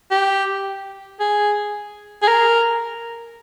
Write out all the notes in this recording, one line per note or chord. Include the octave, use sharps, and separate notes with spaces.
G4
G#4
G#4
A#4